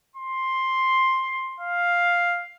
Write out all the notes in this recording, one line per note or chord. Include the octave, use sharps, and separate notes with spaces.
C6
F5